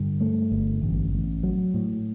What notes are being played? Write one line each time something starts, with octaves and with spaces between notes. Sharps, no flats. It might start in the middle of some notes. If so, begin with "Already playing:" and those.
Already playing: G2 D3
A3
G1
A1
A1
F#3
A2